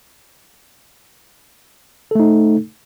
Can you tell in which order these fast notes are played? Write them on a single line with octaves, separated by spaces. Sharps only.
A4 A3 D#4